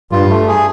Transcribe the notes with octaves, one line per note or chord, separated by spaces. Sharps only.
G2 F4
A3
G#4